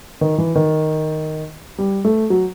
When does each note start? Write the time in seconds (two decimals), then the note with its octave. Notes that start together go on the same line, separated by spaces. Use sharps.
0.21 D#3
0.38 E3
0.55 D#3
1.78 G3
2.05 A3
2.30 F#3